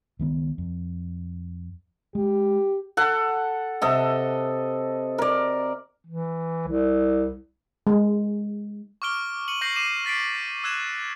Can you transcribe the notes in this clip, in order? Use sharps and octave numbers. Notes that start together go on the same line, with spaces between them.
C#2 D#3 B3
F2
G#3 G4
A4 F#5
C3 A4 D#5
A#4 D5
E3
C2
G#3
C#6 D6 F6 D7 G7
C#7 D#7 F#7
C#6 G6 A#6 C7 F#7
D6 C7 D#7 E7 F#7
F6 A6 B6 C7 D7
D6 E6 F#6 G#6 E7